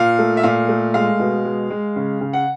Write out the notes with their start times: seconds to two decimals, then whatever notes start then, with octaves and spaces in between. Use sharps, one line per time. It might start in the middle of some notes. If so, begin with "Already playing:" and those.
Already playing: A#2 F5
0.18 A3
0.37 E5
0.43 A#2 F5
0.68 A3
0.94 G#3 F5
1.19 B2
1.45 G#3
1.70 G#3
1.96 C#3
2.21 C#3
2.33 F#5